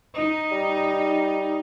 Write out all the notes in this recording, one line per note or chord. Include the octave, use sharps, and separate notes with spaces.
D#4
G3